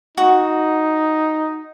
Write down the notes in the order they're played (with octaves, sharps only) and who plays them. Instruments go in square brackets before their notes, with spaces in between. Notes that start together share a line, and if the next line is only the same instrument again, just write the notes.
[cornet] D#4 [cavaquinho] F#4